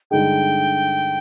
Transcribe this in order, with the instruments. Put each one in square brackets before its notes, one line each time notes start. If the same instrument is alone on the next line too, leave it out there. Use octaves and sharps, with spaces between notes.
[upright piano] G2 D3 G#3 D#4 G#4 [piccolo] G5